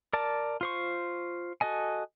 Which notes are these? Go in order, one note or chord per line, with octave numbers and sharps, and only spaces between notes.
A#4 D5 A5
F4 C5 C#6
F#4 A4 D#5 G#5